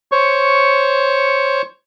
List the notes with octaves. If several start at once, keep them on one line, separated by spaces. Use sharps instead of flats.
C5 C#5 C#6